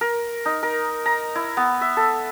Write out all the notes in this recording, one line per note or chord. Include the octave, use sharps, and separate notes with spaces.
A#4
D#4
A#4
A#5
E4
B3
E5
A4